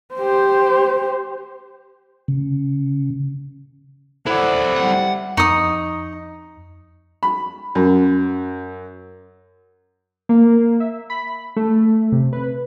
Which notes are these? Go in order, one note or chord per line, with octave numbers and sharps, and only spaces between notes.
G4 C5
C#3
E4 A4 C5 D5 F#5 B5
G3 F#5
F2 D#4 A#5 C#6 D#6 C#7
B5
F#2
A#3
E5
B5
A3
C3
B4